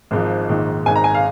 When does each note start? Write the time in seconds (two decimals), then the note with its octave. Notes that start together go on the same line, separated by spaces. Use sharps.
0.11 G#1 G#2 F3
0.49 A#1 G#2 D#3
0.86 G#1 G#2 D#3 G#5
0.96 A#5
1.04 G#5
1.15 F5